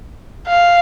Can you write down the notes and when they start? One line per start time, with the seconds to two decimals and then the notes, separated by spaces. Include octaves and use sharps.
0.48 F5